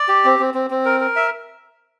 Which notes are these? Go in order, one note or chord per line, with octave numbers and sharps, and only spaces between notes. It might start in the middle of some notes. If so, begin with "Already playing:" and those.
Already playing: D5
G4
C4
C4
C4
C4
A#4
A#4
E5